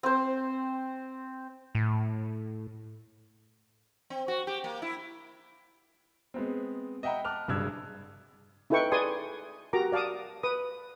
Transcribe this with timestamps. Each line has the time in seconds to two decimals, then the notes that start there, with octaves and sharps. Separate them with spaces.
0.03 C4 C5
1.75 A2
4.10 C4
4.28 F#4
4.47 G4
4.64 A#3
4.82 E4
6.34 G#3 B3 C4
7.03 D#5 E5 F#5 G5 A#5 B5
7.24 A5 D6 F6 F#6 F7
7.48 F#1 G2 G#4 E6 F#6 G#6
8.70 D#4 E4 A4 B4 G5 C#6
8.92 G#4 B4 D5 G#5 C6 D#6
9.73 F#4 G4 A#4 A#5 D6
9.92 D5 F5 A5 D6 D#6
10.43 B4 D#6